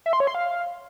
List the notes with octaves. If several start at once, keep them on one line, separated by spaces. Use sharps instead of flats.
E5
C6
C#5
C6
F5